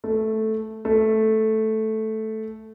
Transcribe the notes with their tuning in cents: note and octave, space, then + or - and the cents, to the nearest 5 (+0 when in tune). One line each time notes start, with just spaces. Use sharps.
A3 -5
A3 -5